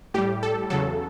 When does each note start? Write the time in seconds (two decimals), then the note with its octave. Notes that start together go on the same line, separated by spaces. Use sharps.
0.14 A2 G3 G4
0.43 A4
0.70 E2 C#3 F#3 A4